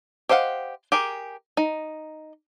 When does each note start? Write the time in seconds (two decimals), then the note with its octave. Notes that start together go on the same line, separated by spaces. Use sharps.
0.29 G4 C5 D#5 F5 F#5
0.92 G4 G#4 A#4
1.57 D#4